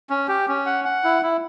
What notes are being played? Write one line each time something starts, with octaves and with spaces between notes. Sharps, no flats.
C#4
G4
C#4
F#5
F#5
E4
E4